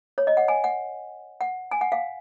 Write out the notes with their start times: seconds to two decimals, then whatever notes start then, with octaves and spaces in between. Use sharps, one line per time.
0.18 C#5
0.27 D#5
0.37 F#5
0.48 G#5
0.64 F#5
1.41 F#5
1.71 G#5
1.81 F#5
1.92 F5